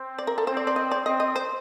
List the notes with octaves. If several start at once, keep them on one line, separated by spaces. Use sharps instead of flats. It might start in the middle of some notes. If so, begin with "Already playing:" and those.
Already playing: C4
D5
A#4
A4
C4 C5
D5
D5
D#5
D5
C4 D#5
D#5
C5